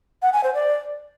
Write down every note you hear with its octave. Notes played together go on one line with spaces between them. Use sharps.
F#5
G#5
C5
D5